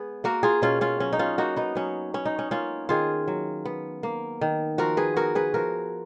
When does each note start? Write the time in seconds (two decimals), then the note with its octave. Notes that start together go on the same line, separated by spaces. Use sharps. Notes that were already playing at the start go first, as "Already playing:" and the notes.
Already playing: G#3 B3 G#4
0.24 A#3 F#4 A#4
0.43 F4 G#4
0.62 B2 C#4 F4
0.81 C#4 F4
1.00 F#3 C#4
1.13 D#4
1.19 C#4 F4
1.38 A#3 D#4 F#4
1.56 B3 D#4
1.75 F#3 C#4
2.14 B3 C#4
2.25 D#4
2.39 C#4
2.51 A#3 C#4 F4
2.89 D#3 F4 G#4
3.28 F#3
3.65 B3
4.03 A#3
4.41 D#3
4.78 F3 F#4 A#4
4.97 G#4 B4
5.16 B3 F#4 A#4
5.35 G#4 B4
5.54 F3 F#4 A#4